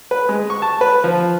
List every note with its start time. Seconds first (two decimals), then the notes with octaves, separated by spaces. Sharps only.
0.11 B4
0.29 G#3
0.50 C#6
0.62 A5
0.81 B4
1.04 F3